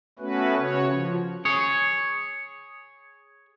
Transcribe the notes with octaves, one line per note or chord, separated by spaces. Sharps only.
A3 B3 C#4 F#4 B4
C#3 F#4 C#5
F3
G#4 C#5